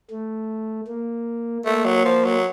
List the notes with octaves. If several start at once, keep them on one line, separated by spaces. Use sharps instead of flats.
A3
A#3
A3 A#3
F#3
F3
F#3